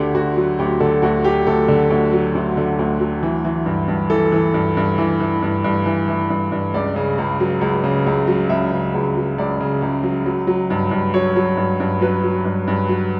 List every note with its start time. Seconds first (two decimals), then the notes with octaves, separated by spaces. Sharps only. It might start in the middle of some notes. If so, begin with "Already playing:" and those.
Already playing: D2 D3 G4
0.14 D2 F#4
0.37 F#3
0.59 D2 G4
0.80 D3 A4
1.02 D2 F#4
1.25 F#3 G4
1.47 D2 A4
1.68 D3
1.90 D2
2.13 F#3
2.35 D2
2.57 D3
2.79 D2
3.00 F#3
3.23 E3
3.45 E3
3.66 G2
3.88 G2
4.10 E3 A4
4.32 E3
4.54 G2
4.77 G2
4.98 E3
5.20 E3
5.42 G2
5.64 G2
5.86 E3
6.08 E3
6.30 G2
6.52 G2
6.74 C#2 D5
6.96 C#3
7.18 C#2
7.40 F#3
7.61 C#2
7.84 C#3
8.06 C#2
8.27 F#3
8.49 C#2 E5
8.72 C#3
8.94 C#2
9.16 F#3
9.38 C#2 D5
9.60 C#3
9.82 C#2
10.03 F#3
10.26 F#3
10.47 F#3
10.70 G2
10.91 G2
11.14 F#3 C#5
11.36 F#3
11.57 G2
11.80 G2
12.01 F#3 B4
12.23 F#3
12.45 G2
12.67 G2
12.89 F#3